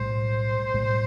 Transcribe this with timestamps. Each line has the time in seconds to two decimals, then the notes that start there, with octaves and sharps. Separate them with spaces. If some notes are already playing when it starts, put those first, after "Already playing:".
Already playing: B1 A2 G3 C5
0.74 B1 A2 G3